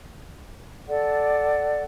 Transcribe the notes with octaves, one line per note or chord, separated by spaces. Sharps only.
A4 D5 F#5